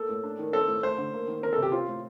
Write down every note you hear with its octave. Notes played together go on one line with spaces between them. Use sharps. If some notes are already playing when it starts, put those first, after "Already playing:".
Already playing: A#3 A4
A2
D4
D#3
C4 A4
A2
A3 C5
D3
A#3
D#3
C4 A#4
A4
C3
G4
C4 F4
A2